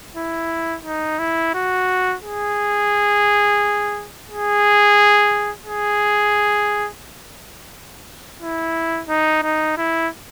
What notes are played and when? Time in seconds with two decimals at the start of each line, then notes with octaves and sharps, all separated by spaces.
0.15 E4
0.85 D#4
1.19 E4
1.54 F#4
2.22 G#4
4.28 G#4
5.66 G#4
8.41 E4
9.09 D#4
9.43 D#4
9.77 E4